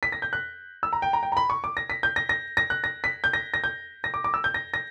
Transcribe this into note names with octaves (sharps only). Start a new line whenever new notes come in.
B6
A#6
G6
F#6
E6
A#5
G5
A#5
G5
A#5
B5
C#6
D6
A#6
B6
G6
A#6
A#6
A#6
F#6
A#6
B6
G6
A#6
A#6
G6
A#6
D6
D6
E6
G6
A#6
A#6